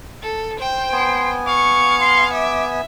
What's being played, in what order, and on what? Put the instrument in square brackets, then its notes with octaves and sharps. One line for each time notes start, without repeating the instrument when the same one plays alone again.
[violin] A4
C5 G5
[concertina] B3 G#5 [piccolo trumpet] C6
[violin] F5 C#7 [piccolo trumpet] C#6
[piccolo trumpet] C6
[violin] E5 [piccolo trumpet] D6